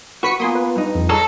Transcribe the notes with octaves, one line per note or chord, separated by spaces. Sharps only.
F#4 B4 C#6 B6 C#7
A#3 B3 F4 G#5 C6 D#6
B4
G2 D#4
F2
G#4 A4 C#5 A#5